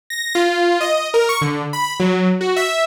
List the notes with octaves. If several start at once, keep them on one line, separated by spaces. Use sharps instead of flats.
A#6
F4
D#5
A#4
C#6
D3
B5
F#3
F#4
E5